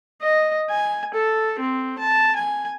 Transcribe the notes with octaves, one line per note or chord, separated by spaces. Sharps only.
D#5
G#5
A4
C4
A5
G#5